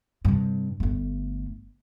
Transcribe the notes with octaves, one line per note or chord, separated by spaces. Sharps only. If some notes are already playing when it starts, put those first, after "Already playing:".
G2 C3
G1 A3